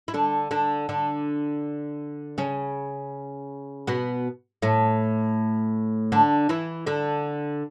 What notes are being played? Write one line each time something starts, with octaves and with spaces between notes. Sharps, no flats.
E4
D3 D4
D3 D4
D3 D4
C#3 C#4
B2 B3
A2 A3
D3 D4
E3 E4
D3 D4